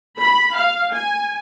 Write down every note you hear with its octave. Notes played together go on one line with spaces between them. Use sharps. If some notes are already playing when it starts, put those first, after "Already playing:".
B5
F5
G#5